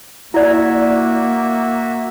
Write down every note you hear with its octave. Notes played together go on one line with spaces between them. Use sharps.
A#3 E4 F#4 D5 E5